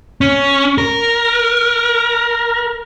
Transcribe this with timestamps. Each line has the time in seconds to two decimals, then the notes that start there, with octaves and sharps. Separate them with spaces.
0.21 C#4
0.78 A#4